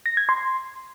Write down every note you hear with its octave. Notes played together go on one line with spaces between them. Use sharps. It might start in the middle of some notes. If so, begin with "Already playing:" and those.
A#6
G#6
C6